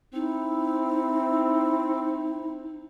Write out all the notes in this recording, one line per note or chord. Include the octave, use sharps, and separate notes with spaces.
C4 D#4 E4